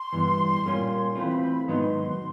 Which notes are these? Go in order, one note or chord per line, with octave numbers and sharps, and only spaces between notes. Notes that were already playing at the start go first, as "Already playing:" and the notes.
Already playing: C6
G2 E3 G3 B3
A#2 G3 A#3 C#4 F4
E3 A3 C4 F4 B5
G#2 D#3 F#3 B3 D#4 C6